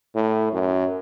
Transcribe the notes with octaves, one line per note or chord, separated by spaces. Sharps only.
A2
F#2